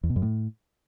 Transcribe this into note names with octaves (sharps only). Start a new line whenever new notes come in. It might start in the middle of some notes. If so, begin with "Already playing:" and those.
E2
B2
F#2
A2